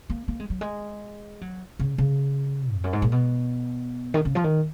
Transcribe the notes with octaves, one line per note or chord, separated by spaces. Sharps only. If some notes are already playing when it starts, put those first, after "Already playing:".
A#3
A#3
G#3
F#3
G#3
F#3
C#3
C#3
F2
F#2
G#2
A#2
B2
D#3
C#3
F3
D#3